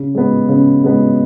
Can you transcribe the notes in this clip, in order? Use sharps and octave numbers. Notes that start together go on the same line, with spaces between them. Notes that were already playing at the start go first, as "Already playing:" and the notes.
Already playing: C#3
G#3 B3
C#3
G#3 B3